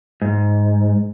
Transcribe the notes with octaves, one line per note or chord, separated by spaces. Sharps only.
G#2